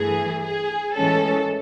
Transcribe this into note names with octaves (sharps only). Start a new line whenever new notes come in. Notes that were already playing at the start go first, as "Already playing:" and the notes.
Already playing: G2 E3 A3 G#4
G#4
A2 E3 G#3 C#4 A4